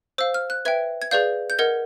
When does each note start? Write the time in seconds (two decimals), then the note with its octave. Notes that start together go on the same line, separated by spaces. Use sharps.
0.18 C5 F5 E6
0.34 F6
0.50 F#6
0.65 B4 E5 G5 G#6
1.02 G#6
1.11 G#4 B4 D5 F5 G6
1.50 G6
1.59 A#4 D#5 F#5 G#6